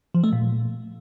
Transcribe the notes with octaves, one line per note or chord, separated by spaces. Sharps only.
F3
A3
A#2